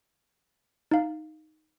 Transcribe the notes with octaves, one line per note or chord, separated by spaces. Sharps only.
D#4 F5